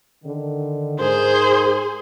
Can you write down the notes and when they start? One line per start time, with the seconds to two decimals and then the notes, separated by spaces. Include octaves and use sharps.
0.24 D3 D#3
1.00 G#2 G#4 A#4 C5